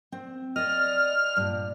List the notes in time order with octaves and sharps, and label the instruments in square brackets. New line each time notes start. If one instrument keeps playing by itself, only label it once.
[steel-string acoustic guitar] C4
[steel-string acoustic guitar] D5 D#5 [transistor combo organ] F6
[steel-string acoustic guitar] G2 A#2